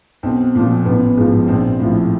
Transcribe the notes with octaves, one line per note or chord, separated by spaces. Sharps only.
B1 C4
A#2 F3
A1 B3
G#2 F3
A#1 C4
A2 F3